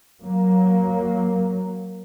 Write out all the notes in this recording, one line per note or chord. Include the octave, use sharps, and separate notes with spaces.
F#3 A#3